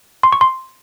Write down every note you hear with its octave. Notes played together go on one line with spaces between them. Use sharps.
C6
C#6
C6